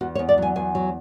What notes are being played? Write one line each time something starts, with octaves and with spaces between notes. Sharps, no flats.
E2 F#4
C#5
E2
D5
F#3 G#5
E2 G#5
F#3